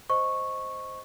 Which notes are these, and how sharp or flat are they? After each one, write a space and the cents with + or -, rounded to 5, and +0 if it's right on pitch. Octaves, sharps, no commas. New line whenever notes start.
C5 +0 D#5 +0 C#6 -10